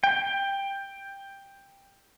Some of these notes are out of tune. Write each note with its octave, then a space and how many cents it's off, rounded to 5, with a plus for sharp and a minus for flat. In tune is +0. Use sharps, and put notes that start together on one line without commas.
G5 +10